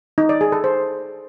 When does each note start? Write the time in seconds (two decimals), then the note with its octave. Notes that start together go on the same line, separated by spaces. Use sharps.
0.18 D#4
0.29 D5
0.41 G#4
0.52 A4
0.64 C5